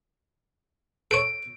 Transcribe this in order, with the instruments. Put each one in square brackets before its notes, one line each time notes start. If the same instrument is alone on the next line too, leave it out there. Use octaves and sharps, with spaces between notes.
[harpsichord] A4 C#5 [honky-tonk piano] D7